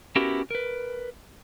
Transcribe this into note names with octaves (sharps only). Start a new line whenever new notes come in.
B3 C#4 E4 F#4 G4 A#4
A#4 B4